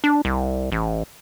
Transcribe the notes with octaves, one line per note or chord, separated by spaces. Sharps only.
D4
C2
A1